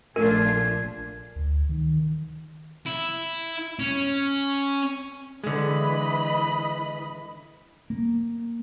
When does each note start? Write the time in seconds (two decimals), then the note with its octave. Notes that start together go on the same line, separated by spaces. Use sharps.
0.16 A#1 A3 D4 F4 A#4 G#5
1.36 D2
1.69 D#3
2.86 E4
3.79 C#4
5.44 D3 E3 G#3 D#5 B5
7.90 A#3